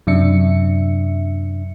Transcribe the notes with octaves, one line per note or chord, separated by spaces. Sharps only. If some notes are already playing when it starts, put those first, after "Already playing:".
F#2 C3 D4 E5 C#7